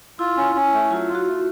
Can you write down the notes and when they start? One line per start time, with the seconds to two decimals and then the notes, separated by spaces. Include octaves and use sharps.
0.19 E4 F4
0.37 C#4
0.55 C#4
0.73 A3
0.90 F#3 F4
1.08 F4
1.15 F#4
1.26 A3